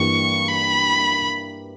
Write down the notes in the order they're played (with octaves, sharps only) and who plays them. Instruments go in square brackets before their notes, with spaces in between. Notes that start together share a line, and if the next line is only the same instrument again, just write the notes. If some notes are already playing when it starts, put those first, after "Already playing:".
Already playing: [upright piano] G2 E3 G3 A#3 E4 [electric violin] C#6
[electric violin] B5